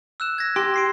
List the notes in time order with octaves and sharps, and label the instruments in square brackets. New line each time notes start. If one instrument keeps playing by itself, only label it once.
[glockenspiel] E6 F#6 E7
G#6 A#6
[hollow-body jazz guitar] G4 [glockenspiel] C6 A#6
[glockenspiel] A#6 C7 D7